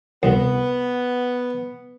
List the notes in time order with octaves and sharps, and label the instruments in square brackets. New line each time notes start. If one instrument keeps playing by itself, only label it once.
[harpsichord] C2 [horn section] B3